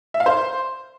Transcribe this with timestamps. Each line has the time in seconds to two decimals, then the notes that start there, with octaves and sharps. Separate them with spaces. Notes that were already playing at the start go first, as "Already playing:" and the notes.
0.14 E5
0.20 F5
0.26 C5